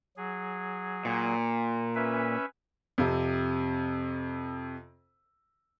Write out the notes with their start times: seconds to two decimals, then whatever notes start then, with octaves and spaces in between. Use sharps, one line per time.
0.17 F#3 G#4
1.05 A#2
1.95 C#4 B4 E5
2.98 F2 C3